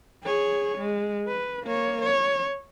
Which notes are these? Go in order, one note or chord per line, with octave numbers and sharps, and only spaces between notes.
G#4 C#5
G#3
B4
A#3 C#5
C#5